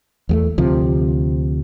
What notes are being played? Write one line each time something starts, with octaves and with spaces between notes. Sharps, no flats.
E2 G#3 A3
D2 C3 F3